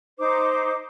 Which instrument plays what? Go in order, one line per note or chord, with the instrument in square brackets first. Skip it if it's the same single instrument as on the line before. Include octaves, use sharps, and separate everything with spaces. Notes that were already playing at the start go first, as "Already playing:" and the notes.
[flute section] D#4 C5 D6